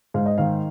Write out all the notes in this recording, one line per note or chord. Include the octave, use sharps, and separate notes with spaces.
G#2 F5
D#5
D#3 F5